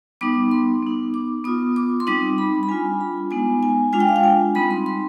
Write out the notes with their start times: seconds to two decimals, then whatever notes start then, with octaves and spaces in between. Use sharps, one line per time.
0.21 G3 B3 D#4 D6
0.51 C6
0.82 B3 D#4
1.14 D6
1.44 B3 F4 D#6
1.76 D6
2.00 C6
2.07 G3 C4 D#4 D6
2.38 B5
2.63 B5
2.68 G3 D4 F4 G#5
3.01 B5
3.31 G#3 B3 D#4 G#5
3.63 G#5
3.93 G#3 D4 F4 G#5
4.00 G5
4.08 F5
4.16 G5
4.23 G#5
4.55 G3 C4 D#4 B5
4.71 C6
4.86 C6